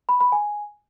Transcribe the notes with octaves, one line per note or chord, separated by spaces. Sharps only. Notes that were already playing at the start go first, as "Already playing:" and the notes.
B5
B5
G#5